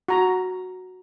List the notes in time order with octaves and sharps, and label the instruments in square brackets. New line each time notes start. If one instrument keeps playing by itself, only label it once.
[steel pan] F#4 A#5